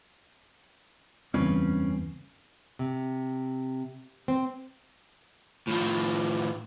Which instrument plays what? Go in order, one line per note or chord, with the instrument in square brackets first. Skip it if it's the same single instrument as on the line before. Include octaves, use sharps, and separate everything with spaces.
[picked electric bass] F#1 E2 [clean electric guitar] G2 C4 B4 [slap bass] C#4
[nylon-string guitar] C3
C4
[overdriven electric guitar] A2 F3